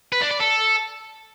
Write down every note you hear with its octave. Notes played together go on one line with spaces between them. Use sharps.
B4
D4
D5
A4